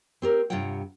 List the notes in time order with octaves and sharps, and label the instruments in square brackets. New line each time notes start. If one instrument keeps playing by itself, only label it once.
[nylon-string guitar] C4 G4 A#4
G2 C3 F4 C#5 F#5 G5